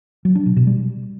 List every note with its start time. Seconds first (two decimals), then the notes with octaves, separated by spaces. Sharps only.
0.25 F#3
0.35 D4
0.46 B2
0.56 B2
0.67 G3